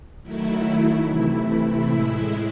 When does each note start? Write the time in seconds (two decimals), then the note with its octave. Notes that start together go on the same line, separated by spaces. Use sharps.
0.23 D#3 F#3 A3 E4
0.63 E4
1.04 C3 E3 A3 E4
1.85 A2 G#3